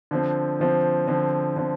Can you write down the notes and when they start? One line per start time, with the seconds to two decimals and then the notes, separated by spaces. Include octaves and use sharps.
0.11 D3 F3 C4
0.60 D3 F3 C4
1.08 D3 F3 C4
1.56 D3 F3 C4